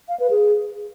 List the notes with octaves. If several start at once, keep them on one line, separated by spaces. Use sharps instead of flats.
F5
B4
G#4